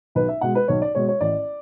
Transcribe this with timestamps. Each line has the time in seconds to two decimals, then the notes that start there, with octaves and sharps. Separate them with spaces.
0.15 B1 B4
0.29 E5
0.41 B2 G#3 F#5
0.55 B4
0.68 B1 C#5
0.82 D5
0.95 B2 G#3 C#5
1.08 C#5
1.21 A1 D5